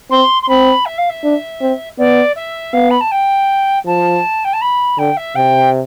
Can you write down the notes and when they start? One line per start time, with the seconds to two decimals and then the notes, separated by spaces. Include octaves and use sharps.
0.10 C4 C6
0.42 C6
0.49 C4 B5
0.85 E5
0.98 F5
1.09 E5
1.23 D4
1.61 C4
1.98 B3 D5
2.36 E5
2.73 B3 F5
2.90 B5
3.00 A5
3.11 G5
3.85 F3 A5
4.44 G5
4.53 A5
4.61 B5
4.98 D3 G5
5.17 E5
5.35 C3 G5